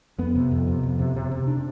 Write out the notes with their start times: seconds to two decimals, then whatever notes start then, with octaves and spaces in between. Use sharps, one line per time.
0.18 F2 B3
0.35 C3
0.52 F2
0.67 C3
0.83 F2
0.99 C3
1.16 C3
1.31 C3
1.47 D4